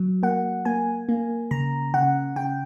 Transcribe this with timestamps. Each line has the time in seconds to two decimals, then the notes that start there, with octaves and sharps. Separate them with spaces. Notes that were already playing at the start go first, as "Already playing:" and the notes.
Already playing: F#3
0.23 A#3 F#5
0.65 A#3 G#5
1.09 A#3
1.51 C#3 A#5
1.94 C#3 F#5
2.36 C#3 G5